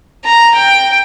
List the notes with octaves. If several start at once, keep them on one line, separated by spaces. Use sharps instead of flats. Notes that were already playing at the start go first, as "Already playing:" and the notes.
A#5
G5